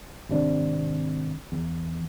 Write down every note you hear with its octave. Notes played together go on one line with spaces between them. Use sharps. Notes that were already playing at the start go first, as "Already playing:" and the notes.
G#1 C3 D4
E2